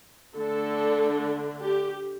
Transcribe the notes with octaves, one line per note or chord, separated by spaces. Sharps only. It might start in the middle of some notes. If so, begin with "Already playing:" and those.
D3 A3 D4 A4
G4